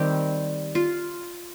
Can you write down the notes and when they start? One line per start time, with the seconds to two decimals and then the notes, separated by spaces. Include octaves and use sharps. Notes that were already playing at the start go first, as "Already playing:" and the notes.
Already playing: D#3 G3 C4 G4
0.75 F4